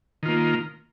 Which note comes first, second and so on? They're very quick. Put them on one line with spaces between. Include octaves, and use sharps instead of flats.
D#3 F4 A#3